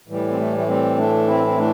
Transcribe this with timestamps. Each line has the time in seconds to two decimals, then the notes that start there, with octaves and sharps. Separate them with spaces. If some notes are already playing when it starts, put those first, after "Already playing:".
0.08 A2 E3 G3
0.30 C4
0.37 A3
0.58 A3
0.67 G3 C4
0.97 A3 D4
1.27 C4 E4
1.47 C4
1.57 A3 D4